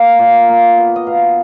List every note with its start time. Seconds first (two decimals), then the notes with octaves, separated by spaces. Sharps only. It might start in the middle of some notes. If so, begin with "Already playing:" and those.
Already playing: A#3 F5
0.19 A#2
0.49 A#3
0.77 B3
0.96 D#5
1.07 B2 F5